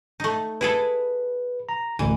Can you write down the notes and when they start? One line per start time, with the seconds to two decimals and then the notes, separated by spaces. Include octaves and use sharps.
0.20 A3 D#4
0.61 E4 G#4 A4 B4
1.69 A#5
1.99 A1 D2 E3